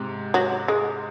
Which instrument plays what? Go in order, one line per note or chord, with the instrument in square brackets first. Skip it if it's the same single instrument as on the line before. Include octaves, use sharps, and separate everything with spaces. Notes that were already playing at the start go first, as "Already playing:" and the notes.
Already playing: [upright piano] G#2 C3
[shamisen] F#3
G#3